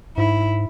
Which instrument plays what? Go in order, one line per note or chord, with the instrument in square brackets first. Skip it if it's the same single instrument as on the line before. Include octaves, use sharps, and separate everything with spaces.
[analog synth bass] G#2 [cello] E4